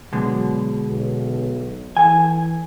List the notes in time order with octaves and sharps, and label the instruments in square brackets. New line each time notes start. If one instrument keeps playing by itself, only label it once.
[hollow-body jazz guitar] B2 D3 G#3 [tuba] F#3
[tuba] B1
[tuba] E3 [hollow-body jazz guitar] A4 G#5